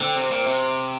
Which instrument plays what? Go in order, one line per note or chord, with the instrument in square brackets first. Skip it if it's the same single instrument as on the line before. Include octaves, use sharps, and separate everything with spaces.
[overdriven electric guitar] D3 [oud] C4
[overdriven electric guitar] C3
[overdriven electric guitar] A#2 [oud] C4
[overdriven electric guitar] C3